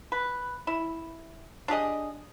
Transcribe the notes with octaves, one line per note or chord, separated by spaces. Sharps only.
B4
E4
D4 G4 G#4 D#5